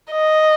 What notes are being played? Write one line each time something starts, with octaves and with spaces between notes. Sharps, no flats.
D#5